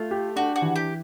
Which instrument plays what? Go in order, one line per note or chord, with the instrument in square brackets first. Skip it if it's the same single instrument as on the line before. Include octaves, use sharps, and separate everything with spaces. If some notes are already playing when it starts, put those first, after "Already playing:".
Already playing: [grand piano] A3 [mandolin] F4
[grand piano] G4
[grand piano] D4 [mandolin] F#4
[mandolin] F#4
[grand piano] E3
[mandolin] G4